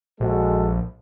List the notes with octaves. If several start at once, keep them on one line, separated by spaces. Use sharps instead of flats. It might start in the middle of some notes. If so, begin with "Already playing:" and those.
A#1 G#3 F#4 A4